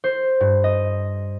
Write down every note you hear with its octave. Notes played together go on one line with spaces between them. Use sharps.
C5
G2
D#5